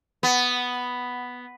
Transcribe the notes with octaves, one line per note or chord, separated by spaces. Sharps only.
B3